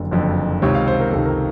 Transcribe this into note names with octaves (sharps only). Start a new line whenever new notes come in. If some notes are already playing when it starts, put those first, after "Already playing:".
Already playing: F#1 F2 D3
F#1 F2 D3
C#2 C3 D#3 C#5
F5
C5
A#4
C#2 C3 D#3 A4
A#4